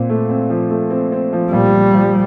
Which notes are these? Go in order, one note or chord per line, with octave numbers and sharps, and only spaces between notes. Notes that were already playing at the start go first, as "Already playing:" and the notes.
Already playing: A#2 C4
A3
C4
F3
A3
C4
C4
F3
A#2 G3
F3
F3